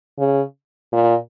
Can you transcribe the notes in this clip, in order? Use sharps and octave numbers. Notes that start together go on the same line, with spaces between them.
C#3
A#2